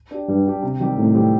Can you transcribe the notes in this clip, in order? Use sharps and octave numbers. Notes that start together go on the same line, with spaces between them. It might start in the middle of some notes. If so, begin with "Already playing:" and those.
D4 G4
G2 G3
D4 G4
C3
D#3 G3 C4 G4
A2 C3
D#3 G3 C4 G4